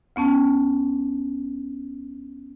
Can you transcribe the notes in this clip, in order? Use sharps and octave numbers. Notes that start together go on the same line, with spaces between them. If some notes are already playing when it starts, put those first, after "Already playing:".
D2 B3 C#4 A5